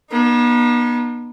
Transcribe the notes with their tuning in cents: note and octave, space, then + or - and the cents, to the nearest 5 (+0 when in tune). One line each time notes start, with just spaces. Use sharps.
B3 -40 D#4 -35